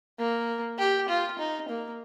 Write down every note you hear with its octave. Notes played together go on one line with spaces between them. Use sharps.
A#3
G4
F4
D#4
A#3